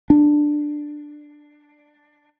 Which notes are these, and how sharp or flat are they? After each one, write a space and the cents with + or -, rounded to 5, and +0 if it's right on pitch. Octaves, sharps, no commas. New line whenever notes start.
D4 +10